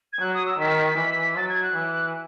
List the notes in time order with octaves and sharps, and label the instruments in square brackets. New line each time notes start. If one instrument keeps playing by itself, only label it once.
[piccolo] G#6
[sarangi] F#3 [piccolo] F#6
[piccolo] D#6
E6
[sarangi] D#3 [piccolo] B6
[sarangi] E3
[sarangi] F#3 [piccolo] A6
[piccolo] G#6
F#6
[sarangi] E3